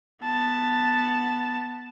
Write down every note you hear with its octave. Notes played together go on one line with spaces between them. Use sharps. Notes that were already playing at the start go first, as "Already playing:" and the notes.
B3 A5